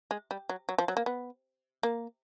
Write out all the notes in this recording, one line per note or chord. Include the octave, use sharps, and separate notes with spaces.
G#3
G3
F#3
F#3
F3
F#3
A#3
B3
A#3